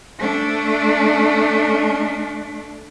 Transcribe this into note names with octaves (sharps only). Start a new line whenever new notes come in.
A3 D4